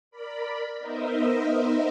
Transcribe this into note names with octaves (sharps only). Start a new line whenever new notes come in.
A#4 D5 B5
B3 D#4 A#4 C5 D#5 E5